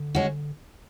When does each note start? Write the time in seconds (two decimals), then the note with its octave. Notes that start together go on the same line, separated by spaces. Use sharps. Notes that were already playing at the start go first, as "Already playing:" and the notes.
Already playing: D3
0.15 G#3 C#4 F#4